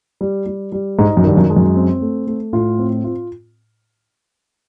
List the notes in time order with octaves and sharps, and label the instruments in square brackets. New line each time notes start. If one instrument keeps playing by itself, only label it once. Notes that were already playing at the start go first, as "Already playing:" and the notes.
[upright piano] G3
G3
G3
[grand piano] G#2 [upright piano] D#4
[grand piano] F#2
[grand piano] G2 [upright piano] D#3
[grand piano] F#2
[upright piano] G#3
[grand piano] F#2
[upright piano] C4
A3
A3
[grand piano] A2 [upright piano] F4
[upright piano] C4
F4